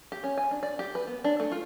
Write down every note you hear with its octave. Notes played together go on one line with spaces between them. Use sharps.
G4
C#4
G#5
D4
D5
G4
B4
B3
D4
A3
F4